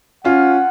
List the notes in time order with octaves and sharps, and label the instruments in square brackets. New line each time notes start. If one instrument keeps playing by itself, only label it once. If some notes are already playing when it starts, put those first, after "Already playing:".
[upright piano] C#4 F4 [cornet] F#5